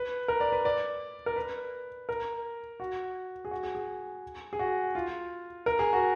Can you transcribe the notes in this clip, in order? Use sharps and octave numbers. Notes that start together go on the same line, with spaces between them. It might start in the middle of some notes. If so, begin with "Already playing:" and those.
Already playing: B4
A#4
D5
B4
D5
A#4
B4
A#4
F#4
G#4
F#4
G#4
G#4
G#4
F#4
F4
A#4
G#4
F#4